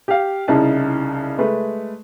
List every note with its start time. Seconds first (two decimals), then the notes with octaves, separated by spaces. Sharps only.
0.08 G4 F5
0.48 C2 C#3 D#4 E4 A5
1.39 G#3 A3 B4